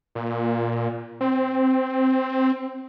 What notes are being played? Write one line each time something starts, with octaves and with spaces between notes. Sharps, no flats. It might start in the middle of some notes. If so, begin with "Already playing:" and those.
A#2
C4